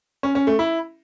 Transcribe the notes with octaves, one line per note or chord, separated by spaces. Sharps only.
C#4
C#4
A3
E4